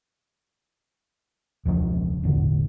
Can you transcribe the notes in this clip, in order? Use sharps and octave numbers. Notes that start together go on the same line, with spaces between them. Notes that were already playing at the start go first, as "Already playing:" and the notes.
E1 C#2 F3 D4
E1 A1 D3